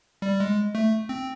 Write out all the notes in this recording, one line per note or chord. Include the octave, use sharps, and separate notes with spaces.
G3
G#3
A3
C4